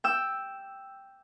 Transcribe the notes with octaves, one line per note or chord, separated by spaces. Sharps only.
G5 E6